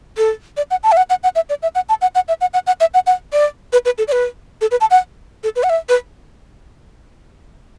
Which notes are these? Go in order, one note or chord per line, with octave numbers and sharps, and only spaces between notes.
A4
D5
F#5
A5
E5
F#5
F#5
F#5
E5
D5
E5
F#5
A5
F#5
F#5
E5
F#5
F#5
F#5
E5
F#5
F#5
D5
B4
B4
A4
D5
B4
A4
B4
A5
F#5
A4
B4
F#5
E5
B4